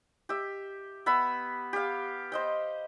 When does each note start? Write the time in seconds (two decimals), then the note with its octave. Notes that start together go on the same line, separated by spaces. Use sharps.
0.29 G4 E5
1.06 B3 E5 B5
1.73 G4 F5
2.32 C5 D#5 G5